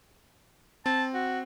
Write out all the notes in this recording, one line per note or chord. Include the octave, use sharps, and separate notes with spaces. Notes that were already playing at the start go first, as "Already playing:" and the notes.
C4 A5
F#4